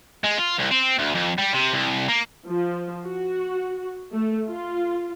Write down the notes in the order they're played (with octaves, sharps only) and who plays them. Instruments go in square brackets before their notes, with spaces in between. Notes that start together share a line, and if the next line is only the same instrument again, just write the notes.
[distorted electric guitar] G#3
F4
C2
C4
D2
F2
G3
C3
C2
A#3
[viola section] F3
F#4
A3
F4